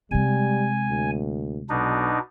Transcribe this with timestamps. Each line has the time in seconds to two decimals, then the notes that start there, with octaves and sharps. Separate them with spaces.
0.11 C3 G3 G#3 G#5
0.88 D2
1.69 B1 B2 D4 D#4